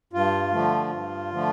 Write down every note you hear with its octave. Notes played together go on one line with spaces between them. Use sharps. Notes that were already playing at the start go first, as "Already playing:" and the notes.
G2 F4
D3 F3 A3
G2
D3 F3 A3